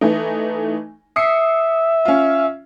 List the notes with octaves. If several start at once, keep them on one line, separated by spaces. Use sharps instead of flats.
E3 A3 D#4
E5 D#6 C7 C#7
C#4 F4